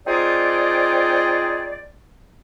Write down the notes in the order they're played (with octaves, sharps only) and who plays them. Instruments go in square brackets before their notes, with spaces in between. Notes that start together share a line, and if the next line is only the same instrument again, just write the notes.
[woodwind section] C4 D#4 F4 G#4 C5 D5